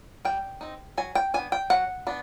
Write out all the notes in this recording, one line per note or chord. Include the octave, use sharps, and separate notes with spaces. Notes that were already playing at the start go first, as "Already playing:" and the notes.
G3 G5
C4 D#4
F#3 G#5
G5
B3 D4 G#5
G5
F#3 F#5
B3 D4